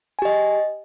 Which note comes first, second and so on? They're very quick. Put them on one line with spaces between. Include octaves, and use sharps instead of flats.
G#5 G4 D#5